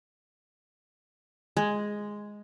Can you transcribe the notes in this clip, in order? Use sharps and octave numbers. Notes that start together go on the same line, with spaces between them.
G#3